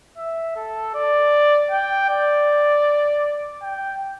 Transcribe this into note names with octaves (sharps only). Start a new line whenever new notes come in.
E5
A4
D5
G5
D5
G5